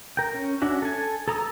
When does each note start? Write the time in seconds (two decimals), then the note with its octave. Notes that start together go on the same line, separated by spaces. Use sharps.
0.17 A#4 G5
0.34 C#4
0.62 C#4 D4 F#4 E5
0.82 A4 G#5
1.28 A4 A#5 D#6 E6